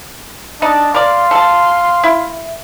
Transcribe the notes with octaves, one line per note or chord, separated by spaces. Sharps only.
D4 D#4 D#5 A5
A#4 D5 F5 C6
A4 A5
E4